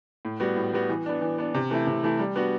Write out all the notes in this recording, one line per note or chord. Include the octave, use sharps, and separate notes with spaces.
A2
G3 B3 F#4
A2
G3 B3 F#4
E3
B3 D4
E3
B3 D4
C3
E3 A3 E4
C3
E3 A3 E4
G3
B3 D4 F#4